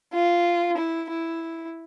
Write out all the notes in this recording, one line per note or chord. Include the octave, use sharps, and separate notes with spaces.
F4
E4
E4